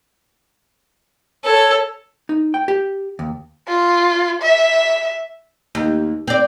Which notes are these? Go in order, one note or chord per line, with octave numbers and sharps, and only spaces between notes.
A4 C#5
D#4
G5
G4
D#2
F4
E5
D#2
C4 D5